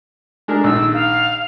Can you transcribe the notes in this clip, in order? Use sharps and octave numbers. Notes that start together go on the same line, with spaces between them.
G#3 D4 A#4
A#1 D#3 E6
F5